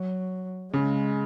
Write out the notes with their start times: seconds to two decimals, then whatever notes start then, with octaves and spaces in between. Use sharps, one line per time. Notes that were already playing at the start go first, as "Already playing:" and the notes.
Already playing: F#3
0.73 C#3 G#3